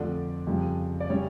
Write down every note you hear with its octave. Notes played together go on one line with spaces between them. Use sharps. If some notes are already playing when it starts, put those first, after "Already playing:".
Already playing: F2 D3 F3 A3 D4 D5
F2 C#3 G3
D5
C#3 G3 C#4 C#5